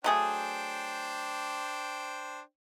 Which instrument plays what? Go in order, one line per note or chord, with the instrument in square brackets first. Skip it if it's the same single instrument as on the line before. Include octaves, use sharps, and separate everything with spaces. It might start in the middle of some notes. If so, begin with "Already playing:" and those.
[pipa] F#3 A3 G#4 [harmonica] D4 C5 G5